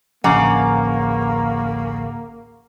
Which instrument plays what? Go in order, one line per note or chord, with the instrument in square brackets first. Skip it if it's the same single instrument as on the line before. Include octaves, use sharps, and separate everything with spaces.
[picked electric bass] A1 D2 F3 [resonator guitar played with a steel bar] C#3 [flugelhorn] A#3 [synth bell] F#5 A#5 D6